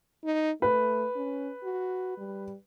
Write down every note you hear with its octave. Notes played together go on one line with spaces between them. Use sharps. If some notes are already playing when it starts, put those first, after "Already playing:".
D#4
A3 B4
C#4
F#4
G3